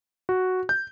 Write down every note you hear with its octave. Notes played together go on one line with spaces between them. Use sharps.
F#4
G6